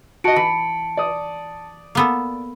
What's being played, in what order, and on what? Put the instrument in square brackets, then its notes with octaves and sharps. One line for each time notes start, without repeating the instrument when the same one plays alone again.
[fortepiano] F#4 D#5 [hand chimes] A5 C#7 D7
[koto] E3 [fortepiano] B5
[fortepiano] D5 D#6
[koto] A#3 B3 A4